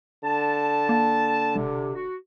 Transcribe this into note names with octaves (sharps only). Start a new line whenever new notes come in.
D3 A5
A#3
E1 C3
F#4